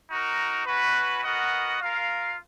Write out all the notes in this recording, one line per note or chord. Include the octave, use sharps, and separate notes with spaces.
D#4 F#4 A#4
C#4 F#4 B4
B3 F#4 A#4 D#5 F#5
F4 A#4 F5